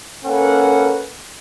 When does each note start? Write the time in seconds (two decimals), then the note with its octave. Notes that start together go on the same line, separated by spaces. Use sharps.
0.24 A#3 C#4 A4 B4 F#5